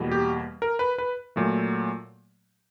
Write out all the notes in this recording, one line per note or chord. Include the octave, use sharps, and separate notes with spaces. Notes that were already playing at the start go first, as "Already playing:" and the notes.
Already playing: E2 B2 G3 A#3
G4
A#4
B4
B4
A#2 F#3 A3